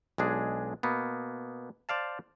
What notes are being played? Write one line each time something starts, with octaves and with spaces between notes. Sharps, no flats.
B1 G#3 D4 G#4
B2 A#3 B3
C5 D5 F5 A5